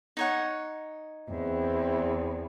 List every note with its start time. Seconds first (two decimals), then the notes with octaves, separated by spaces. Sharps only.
0.17 D#4 C#5 F#5
1.29 E2 C4